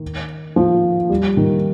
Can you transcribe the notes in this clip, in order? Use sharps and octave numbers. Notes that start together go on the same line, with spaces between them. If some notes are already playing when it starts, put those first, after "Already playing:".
Already playing: D#3
F3
G3
D#3